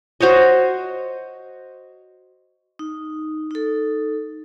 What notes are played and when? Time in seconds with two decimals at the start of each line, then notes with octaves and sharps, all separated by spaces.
0.21 F#4 C5 C#5 D#5
2.79 D#4
3.51 D#4 A4